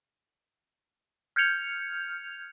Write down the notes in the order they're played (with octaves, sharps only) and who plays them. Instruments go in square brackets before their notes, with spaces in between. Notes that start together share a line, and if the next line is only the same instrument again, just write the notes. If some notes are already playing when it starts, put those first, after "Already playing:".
[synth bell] F6 G6 G#6 C#7 F7